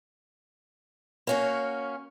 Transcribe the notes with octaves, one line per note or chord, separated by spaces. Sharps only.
A#3 C#4 F#4